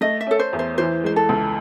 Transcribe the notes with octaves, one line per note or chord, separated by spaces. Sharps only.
A3 D#5
E5
C#4 A4
C5
E2
C5
E3 C5
G#3 C5
A4
C#2